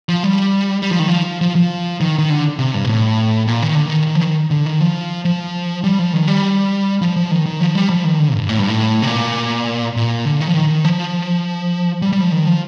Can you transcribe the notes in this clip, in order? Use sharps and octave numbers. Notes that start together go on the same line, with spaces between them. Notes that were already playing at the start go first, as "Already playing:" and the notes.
F3
G3
G3
F3
D#3
F3
F3
F3
D#3
D#3
D3
C3
G2
A#2
A2
A#2
D#3
D3
D#3
D#3
F3
D#3
D3
D#3
F3
F3
G3
F3
D#3
G3
F3
F3
D#3
D#3
F3
G3
F3
D#3
D3
G2
A2
G2
A2
C3
A#2
A#2
D3
D#3
F3
D#3
F3
G3
G3
F3
D#3
F3